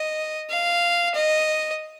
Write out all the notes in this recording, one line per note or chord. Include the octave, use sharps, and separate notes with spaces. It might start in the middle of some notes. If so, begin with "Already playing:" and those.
Already playing: D#5
F5
D#5